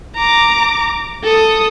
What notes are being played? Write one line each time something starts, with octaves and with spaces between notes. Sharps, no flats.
A#5 D6
A4 D#6